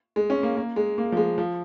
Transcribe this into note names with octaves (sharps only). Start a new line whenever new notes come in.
G#3
C#4
A#3
A#3
G#3
A#3
F3
G#3
F3